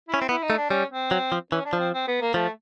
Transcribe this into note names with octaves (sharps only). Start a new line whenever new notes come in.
E4
C#4
C4
B3 E4
D#4
A3
D4
G3 C#4
C4
F#3
F3
E3 C#4
D4
F3
C4
C4
B3
A#3
F3 A3